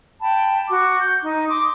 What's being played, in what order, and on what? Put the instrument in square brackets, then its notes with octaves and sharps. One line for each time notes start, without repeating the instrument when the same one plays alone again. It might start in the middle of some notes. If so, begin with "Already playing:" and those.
[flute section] G5 A5 B5
F#4 D6
G6
D#4
C6 D6 D#6